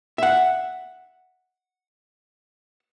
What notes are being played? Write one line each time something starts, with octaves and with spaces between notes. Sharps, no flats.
E5 F#5